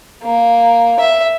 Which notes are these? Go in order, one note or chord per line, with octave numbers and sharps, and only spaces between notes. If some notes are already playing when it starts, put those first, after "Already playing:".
A#3
E5